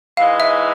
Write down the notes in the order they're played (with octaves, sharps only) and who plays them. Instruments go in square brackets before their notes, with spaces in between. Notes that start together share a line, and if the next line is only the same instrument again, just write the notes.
[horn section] G#2 E3 G#3 [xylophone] F5
[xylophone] E5